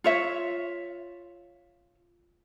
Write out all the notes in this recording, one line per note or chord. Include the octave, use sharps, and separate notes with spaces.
F4 C#5 E5